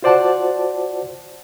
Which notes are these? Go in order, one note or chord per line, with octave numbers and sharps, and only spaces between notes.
F4 F#4 C5 D5 F#5 A5